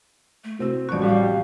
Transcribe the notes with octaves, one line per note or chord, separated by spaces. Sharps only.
A3
C3 C4 E4 F#4
A1 F3 F#3 F#4 D5 C#6
G3 F#4 F5